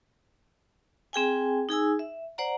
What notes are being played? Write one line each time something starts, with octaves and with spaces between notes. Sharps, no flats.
C4 G#4 G5 G#5
D#4 G#4 G#5 E6
E5
C5 D5 F#5 A#5